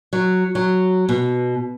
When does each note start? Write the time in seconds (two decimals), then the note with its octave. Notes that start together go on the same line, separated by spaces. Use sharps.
0.13 F#3
0.55 F#3
1.09 B2